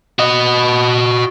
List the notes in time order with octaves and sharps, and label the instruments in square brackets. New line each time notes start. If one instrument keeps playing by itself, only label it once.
[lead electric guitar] F#4 D#5